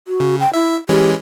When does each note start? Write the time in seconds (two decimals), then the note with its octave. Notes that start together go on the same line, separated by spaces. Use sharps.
0.08 F#4
0.20 C#3
0.40 G5
0.54 E4 E5
0.89 E3 G#3 C#4 G4